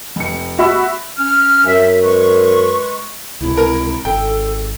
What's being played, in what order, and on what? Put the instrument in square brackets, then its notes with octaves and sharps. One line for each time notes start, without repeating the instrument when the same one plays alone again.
[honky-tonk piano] F1 C#7
F#4 E5 B5 E6
[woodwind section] C#4 F6
[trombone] F#2 [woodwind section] E5
[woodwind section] G#3 B4 C#6
[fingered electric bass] C#2 C3 [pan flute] E4
[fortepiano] A#4
[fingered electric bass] G#1 [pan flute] A4 [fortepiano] G5